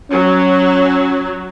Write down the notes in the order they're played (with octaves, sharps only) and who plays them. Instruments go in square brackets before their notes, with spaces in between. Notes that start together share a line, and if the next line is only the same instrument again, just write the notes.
[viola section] F#3 [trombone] C#4